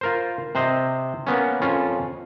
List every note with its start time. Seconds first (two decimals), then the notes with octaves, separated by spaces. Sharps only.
0.01 F4 A#4 C5
0.55 C3 C5 D#5
1.27 A#3 B3 C#4
1.62 F2 C#4 F4